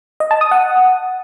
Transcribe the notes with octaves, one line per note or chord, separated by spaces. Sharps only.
D#5
A5
D#6
F#5